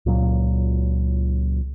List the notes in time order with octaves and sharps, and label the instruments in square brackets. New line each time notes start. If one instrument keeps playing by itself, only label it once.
[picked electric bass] C#2 A#2 F#3